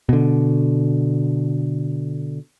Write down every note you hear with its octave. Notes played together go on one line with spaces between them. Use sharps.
B2 D3